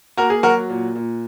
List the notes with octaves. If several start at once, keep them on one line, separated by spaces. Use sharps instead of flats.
A#3 F#4 A#4
G#4
F#3 F#4 A#4
A#2
A#2